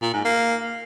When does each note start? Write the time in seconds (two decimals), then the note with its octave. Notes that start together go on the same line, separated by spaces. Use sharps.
0.02 A#2
0.13 G#2
0.25 A#3